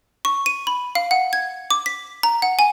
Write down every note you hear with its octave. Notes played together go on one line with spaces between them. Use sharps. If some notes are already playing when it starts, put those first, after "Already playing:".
C#6
D#7
B5
F5
F#5
G#6
D6
B6
A#5
F#5
G#5